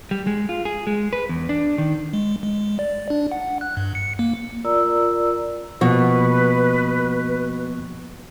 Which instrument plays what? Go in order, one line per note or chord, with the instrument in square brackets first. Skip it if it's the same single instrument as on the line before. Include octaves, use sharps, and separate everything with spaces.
[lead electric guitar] G3
G#3
F4
G#4
G#3
B4
E2
D4
D#3
[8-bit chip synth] G#3
G#3
D5
D4
F#5
F#6
G2
C#7
A#3
[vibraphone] F4 A#4 D5 A#5 E6
[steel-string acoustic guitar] B2 [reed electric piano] F3 A#3 [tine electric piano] B3 C#6 [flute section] B4